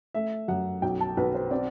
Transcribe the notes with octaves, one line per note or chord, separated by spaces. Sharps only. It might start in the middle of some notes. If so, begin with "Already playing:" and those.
A3 E5
F#2 F#5
B1 G5
A5
B1 B4
C5
C4 D5